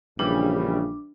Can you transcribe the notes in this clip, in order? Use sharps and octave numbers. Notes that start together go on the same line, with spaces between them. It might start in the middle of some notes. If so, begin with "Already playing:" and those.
A#1 C#3 E3 G3 D4